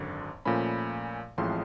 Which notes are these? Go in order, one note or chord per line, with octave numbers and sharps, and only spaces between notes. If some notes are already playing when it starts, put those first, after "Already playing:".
Already playing: G#1 F#2 D3
A#2 F3 A3 C#4 B5
A1 A2 F3 G#3 C4 C6